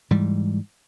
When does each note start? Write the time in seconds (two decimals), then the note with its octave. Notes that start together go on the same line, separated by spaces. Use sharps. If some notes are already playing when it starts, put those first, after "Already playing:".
0.11 G#2 E3 G3